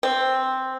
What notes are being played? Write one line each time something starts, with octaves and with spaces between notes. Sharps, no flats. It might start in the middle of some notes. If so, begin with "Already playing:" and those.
C4